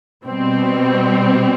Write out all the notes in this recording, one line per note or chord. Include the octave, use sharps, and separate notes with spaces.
B2 G3 C4